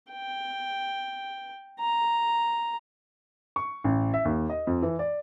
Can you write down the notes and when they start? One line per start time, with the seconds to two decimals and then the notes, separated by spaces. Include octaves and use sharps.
0.11 G5
1.80 A#5
3.56 C#6
3.84 A1
4.14 E5
4.25 D#2
4.50 D#5
4.67 F2
4.82 E3
4.99 D5